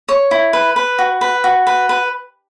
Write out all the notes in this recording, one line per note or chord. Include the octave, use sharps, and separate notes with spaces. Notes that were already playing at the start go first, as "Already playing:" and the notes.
C#5
E4
B4
B4
F#4
B4
F#4
B4
B4